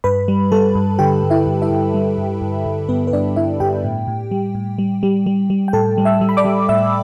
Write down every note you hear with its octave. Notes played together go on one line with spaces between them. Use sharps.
G2 B4 B5
G3
G3 A4 A5
G2
D3 G4 G5
G2
E4 E5
G2
E4 E5
G2
G3
G2
G2
G2
G2 B3 B4
B4
G2 D4 D5
G2 E4 E5
G2 G4 G5
A2
A2
G3
A2
G3
G3
G3
G3
G5
A2 A4 A5
G3
E5 E6
G3
B5
D5 D6
G3
A2 E5 E6